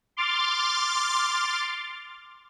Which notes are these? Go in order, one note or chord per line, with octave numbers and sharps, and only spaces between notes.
C6 D6 F6 A6